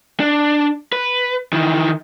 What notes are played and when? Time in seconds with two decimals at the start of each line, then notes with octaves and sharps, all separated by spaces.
0.20 D4
0.92 B4
1.53 D#3 E3